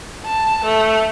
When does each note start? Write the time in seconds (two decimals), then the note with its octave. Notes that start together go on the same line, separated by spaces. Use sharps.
0.25 A5
0.65 A3